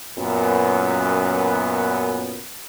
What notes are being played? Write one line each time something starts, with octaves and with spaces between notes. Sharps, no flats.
F#2 A#2 B3